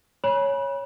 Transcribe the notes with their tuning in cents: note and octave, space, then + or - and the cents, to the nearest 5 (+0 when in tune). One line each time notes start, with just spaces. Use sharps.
C#5 +0 G#5 +0 B5 -35